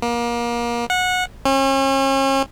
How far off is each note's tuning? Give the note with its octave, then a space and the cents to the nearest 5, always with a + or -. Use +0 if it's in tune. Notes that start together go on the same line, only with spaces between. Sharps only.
A#3 +30
F#5 -20
C#4 -40